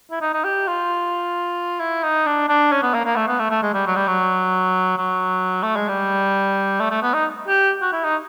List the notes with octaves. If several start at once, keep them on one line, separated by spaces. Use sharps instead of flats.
E4
D#4
D#4
G4
F4
E4
D#4
D4
D4
C#4
B3
A#3
A#3
A3
B3
A3
A3
G#3
G3
F#3
G3
F#3
F#3
A3
G#3
G3
A3
A3
B3
D#4
G4
F#4
E4
D#4